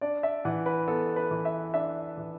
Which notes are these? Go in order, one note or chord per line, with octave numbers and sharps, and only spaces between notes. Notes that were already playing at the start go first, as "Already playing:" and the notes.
D4 D5
E5
E3 F#5
B4
B3 A4
B4
E3
E5
D4 E5
E3